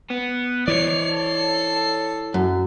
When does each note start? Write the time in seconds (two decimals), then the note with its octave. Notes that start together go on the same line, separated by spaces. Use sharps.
0.10 B3
0.68 E3 C#5 D5 C7
1.14 A4 C7
2.34 F#2